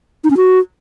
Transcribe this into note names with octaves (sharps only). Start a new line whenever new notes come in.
D#4
C#4
F#4